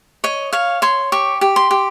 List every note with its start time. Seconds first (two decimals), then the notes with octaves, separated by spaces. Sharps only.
0.24 C#5 D#5
0.53 C#5 F5
0.82 C#5 C6
1.12 G4 C#6
1.41 G4
1.56 C6
1.71 G4